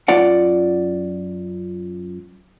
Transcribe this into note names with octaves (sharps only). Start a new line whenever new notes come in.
F#2 F4 D5 F#5